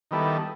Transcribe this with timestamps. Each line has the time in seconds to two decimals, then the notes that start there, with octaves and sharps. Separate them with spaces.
0.11 D#3 G3 B3 E4 A4